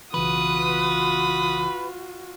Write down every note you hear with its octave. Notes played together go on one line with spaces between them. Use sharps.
B1 C#3 E3 F4 F#4 B4 D#6